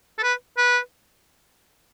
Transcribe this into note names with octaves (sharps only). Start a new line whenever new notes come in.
A4
B4
B4